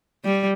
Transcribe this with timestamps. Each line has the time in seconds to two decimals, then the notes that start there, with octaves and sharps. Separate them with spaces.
0.25 G3